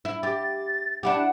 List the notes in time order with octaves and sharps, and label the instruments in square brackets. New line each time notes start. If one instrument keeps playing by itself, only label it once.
[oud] E4
[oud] G4 [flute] A6
[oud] D4 E4 G4 [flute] F#5